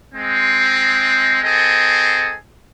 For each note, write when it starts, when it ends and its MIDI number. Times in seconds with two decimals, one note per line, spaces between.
0.15 1.39 56
0.15 1.39 60
1.44 2.34 60
1.44 2.34 68
1.44 2.34 69
1.44 2.34 75